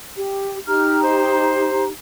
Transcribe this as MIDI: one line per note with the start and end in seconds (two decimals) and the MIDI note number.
0.17 0.58 67
0.67 1.89 63
0.67 1.89 67
0.67 1.89 82
0.67 1.00 89
1.02 1.84 72